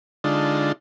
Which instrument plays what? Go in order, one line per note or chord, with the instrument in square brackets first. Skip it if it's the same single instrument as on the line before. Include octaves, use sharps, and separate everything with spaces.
[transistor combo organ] D3 G#3 D4 D#4 F4 A5